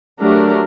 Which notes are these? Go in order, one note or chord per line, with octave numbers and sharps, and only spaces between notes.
F#3 A3 D4 G4 A#4